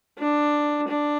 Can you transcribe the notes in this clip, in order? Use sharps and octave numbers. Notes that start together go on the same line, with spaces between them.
D4
D4